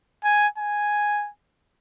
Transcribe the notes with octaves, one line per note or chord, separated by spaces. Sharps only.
G#5
G#5